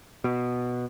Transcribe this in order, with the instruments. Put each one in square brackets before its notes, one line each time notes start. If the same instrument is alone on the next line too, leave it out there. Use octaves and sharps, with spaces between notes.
[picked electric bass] B2